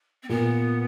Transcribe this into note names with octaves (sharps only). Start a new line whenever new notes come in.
C4
A#2 B3